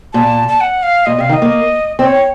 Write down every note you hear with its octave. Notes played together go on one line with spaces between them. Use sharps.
A#2 A5
A5
F#5
F5
A#2 D#5
C3 F5
D#3
D#5
A#3
C4 D#5
C#5